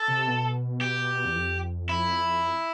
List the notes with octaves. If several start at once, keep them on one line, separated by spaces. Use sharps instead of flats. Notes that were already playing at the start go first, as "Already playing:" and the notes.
Already playing: A4
C3
B2
G4
E2
F2
E4